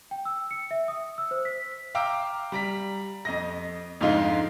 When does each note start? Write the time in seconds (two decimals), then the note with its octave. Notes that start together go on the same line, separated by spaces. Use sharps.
0.11 G5
0.25 E6
0.51 C#7
0.71 E5
0.88 D#6
1.18 E6
1.31 C5
1.45 B6
1.95 F5 G5 A#5 D6 E6
2.52 G3 A#5 B6
3.25 F2 D#5 A#6
4.01 F2 G#2 D3 G#3 D#4 F4